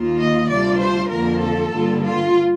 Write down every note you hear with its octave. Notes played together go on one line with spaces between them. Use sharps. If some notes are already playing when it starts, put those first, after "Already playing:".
Already playing: D#2 D#3 A#3 F4
D#5
D2 C3 G3 D4 F4 D5
C5
F2 D3 F3 A#3 A#4
A4
G2 D3 G3 A#3 F4
F4